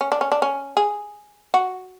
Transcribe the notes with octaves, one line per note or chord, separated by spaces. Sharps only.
C#4
D4
C#4
D4
C#4
G#4
F#4